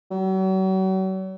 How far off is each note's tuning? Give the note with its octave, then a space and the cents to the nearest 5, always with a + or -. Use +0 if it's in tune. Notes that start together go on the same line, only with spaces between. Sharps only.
F#3 +40